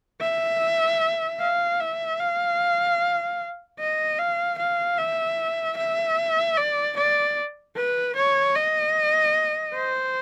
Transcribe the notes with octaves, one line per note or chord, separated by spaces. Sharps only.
E5
F5
E5
F5
D#5
F5
F5
E5
E5
D5
D5
B4
C#5
D#5
C5